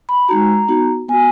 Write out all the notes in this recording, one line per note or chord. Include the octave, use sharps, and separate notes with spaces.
B5
G#3 D#4 F#4 A#5
B3 D#4 F#4
B3 F#4 G#5